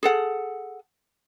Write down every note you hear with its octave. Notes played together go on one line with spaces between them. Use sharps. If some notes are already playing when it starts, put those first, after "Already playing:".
G#4 A4 F#5